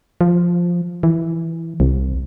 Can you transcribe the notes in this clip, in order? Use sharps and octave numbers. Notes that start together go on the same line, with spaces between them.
F3
E3
C2